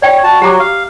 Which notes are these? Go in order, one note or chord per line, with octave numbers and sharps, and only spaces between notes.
C#5 D5 G5
F#4 A5
F#3 F#4 G4 A#5 D6
F5